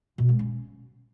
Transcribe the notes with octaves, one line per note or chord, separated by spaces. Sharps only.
B2
G#3
C#4